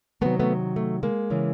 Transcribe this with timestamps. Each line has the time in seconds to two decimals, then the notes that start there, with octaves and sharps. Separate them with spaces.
0.21 C3 D#3 F#3 A3 B3
0.39 A3 B3
0.76 A3
1.03 G#3 A#3
1.30 C#3 E3